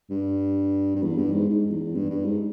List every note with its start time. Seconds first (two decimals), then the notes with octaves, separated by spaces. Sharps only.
0.10 G2
0.96 G2
1.02 E2
1.18 G2
1.32 G#2
1.48 G#2
1.71 E2
1.95 G2
2.10 G2
2.25 G#2